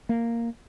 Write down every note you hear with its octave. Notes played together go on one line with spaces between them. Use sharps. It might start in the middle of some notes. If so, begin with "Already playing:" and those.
A#3